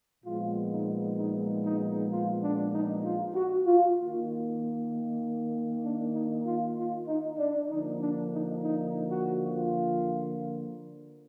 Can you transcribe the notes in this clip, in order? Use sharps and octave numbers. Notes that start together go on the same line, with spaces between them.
A#2 F3 G#3 B3 F4
D#4
D#4
D#4
F4
D4
D#4
F4
F#4
F4
D#3 A#3
D4
D#4
F4
F4
D#4
D4
D3 F3 A#3 D#4
D4
D#4
D#4
F#4
F4